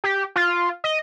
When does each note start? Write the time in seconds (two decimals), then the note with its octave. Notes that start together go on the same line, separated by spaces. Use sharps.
0.04 G4
0.36 F4
0.84 D#5